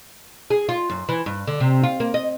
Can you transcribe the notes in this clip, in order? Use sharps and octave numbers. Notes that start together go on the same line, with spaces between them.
G#4
F4
F#2
E3
G2
D3
C3
F4
A#3
D#5